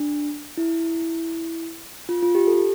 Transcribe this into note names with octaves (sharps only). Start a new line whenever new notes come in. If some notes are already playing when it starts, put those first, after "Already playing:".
Already playing: D4
E4
F4
F4
G4
A4
G4